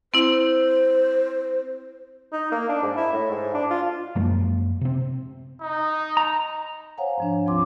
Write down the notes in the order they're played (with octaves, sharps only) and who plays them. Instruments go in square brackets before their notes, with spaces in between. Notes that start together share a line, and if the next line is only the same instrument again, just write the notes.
[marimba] C4 E4 [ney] C5
[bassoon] D#4
A#3
D4
G#2
E4
A2
G#2
D4
F4
[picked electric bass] F#2 F3 G#3 A#3
C3 C4
[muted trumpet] D#4
[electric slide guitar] A#5
[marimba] C5 C#5 F5 F#5 G#5 A#5
G#2 F3 D4
D2 F3 C4 F4 C6 D6